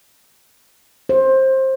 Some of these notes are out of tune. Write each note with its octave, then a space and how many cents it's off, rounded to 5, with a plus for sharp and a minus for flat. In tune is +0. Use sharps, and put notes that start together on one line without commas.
C5 +20